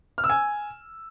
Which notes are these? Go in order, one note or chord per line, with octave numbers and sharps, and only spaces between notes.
F6
E6
G#5